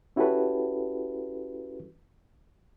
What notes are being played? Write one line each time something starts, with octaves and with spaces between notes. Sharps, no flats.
C#4 E4 F#4 G4 A4 B4